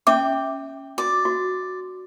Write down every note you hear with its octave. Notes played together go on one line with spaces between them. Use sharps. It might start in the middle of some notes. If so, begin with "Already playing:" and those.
C#4 E5 G5 D6
F#4 D5
F#4